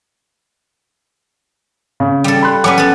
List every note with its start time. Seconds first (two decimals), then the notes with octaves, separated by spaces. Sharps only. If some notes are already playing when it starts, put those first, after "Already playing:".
2.00 C#3
2.24 G3 A4
2.43 B5 C6 F#6
2.64 F#3 C#4 B4 D6
2.78 B3 A4